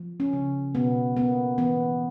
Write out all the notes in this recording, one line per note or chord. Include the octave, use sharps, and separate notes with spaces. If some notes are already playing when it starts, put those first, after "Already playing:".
Already playing: F3
C#4
C#3
B2 B3
A#3 B3
E3 B3